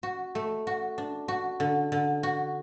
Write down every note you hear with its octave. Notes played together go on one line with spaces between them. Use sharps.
F#4
A3
F#4
D4
F#4
D3
D3
F#4